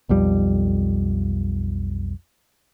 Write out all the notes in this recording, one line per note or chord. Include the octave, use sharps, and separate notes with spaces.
B1 F2 G3